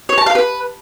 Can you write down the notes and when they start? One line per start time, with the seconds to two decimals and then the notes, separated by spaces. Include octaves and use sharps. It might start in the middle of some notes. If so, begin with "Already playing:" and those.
0.09 C#5
0.18 A5
0.26 F5
0.35 B4